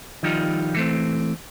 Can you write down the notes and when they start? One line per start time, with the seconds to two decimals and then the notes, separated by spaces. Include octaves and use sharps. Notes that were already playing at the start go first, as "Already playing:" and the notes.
0.23 D#3 F3 G3 D#4 F4
0.75 E3 A3 C4